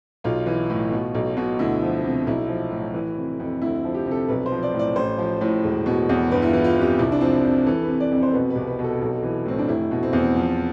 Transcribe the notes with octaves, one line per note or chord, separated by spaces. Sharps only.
B1 F4
E3
A2
B2
B1
B2
D2 E4
F3
C3
B1 E4
F3
A2
E3
C3
F2
D2 E4
F3
G4
C3
A4
B1 B4
C5
F3
D5
A2
D5
A1 C5
F3
A2
E1
B2
E2
G1 B4
E4
E3 F4
F4
F2
G4
C2 E4
D4
F3 C4
C3
E3 A4
C3 B4
D5
F2
C5
B2 B4
B4
C2
B4
B2
A4
B1
E3
A2 C4
D4
F1 E4
B2
C4
E2
C4
F3